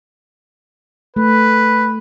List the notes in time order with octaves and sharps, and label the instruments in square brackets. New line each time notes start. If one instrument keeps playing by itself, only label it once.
[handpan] A3 [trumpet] B4